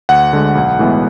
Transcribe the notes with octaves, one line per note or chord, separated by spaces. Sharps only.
D2 F#5
D3 G#3
B1
A2 E3 G#3 B3